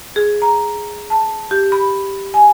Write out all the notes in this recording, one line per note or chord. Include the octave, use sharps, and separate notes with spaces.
G#4
A#5
A5
G4
B5
G#5